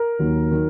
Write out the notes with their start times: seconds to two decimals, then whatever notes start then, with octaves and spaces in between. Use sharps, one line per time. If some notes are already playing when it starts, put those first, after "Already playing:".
Already playing: A#4
0.19 D#2 D#3 F#3
0.51 D#3 F#3